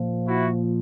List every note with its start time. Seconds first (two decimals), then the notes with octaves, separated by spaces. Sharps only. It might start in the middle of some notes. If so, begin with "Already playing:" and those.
Already playing: A#2 F3
0.27 E4 F#4